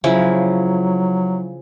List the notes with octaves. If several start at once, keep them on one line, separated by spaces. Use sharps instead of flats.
C#3 F3 F#3 E4